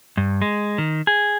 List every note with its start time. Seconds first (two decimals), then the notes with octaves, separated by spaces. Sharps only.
0.17 G2
0.42 G#3
0.78 D#3
1.07 G#4